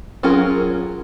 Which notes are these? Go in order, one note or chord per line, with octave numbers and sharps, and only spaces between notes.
F#3 C#4 F4 G#4 A#4